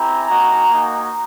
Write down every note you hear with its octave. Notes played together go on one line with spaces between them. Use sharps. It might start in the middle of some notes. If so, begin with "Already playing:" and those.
Already playing: C4 E4 G4 G#5 A#5
A#3 D#4 F#4
A#3 D#4 F#4